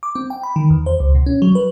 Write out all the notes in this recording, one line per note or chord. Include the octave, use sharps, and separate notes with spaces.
D6
C4
G5
B5
D#3
E2
C5
C#2
B2
C#4
F#3
B4